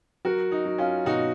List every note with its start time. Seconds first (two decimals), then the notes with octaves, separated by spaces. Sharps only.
0.25 F#3 F#4 A#4
0.52 D#4
0.65 F#3
0.78 C#4 F4
1.05 B2 D#4 F#4